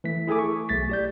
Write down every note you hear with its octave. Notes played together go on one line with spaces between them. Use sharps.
E3 A3 B6
E4 G#4 A4 G#5 D6
C#6
B1 A3 A6 B6
G4 D5 G6